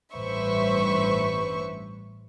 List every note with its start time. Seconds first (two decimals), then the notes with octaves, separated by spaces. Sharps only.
0.14 A1 G2 B4 C5 E5 C#6